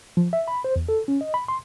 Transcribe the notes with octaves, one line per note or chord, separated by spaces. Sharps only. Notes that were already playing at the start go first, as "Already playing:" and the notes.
F3
E5
B5
C5
E2
A4
C#4
D#5
B5
C6